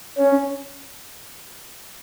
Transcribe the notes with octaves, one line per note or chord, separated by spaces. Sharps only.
C#4